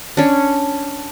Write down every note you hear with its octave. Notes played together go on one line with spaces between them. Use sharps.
C#4 D4